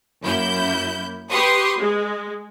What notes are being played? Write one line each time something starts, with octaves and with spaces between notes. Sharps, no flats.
F#2 A#3 E4 G6
G4 B4 C6 C#6 D#6
G#3